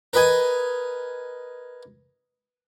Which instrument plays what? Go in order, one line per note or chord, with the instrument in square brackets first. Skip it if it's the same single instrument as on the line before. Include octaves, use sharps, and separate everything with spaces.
[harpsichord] A#4 B4 D#5 G#5